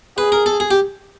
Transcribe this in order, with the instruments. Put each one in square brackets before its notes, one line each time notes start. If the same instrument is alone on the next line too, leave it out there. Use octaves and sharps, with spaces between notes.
[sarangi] G#4 [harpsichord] B4
[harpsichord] A#4
A4
G#4
G4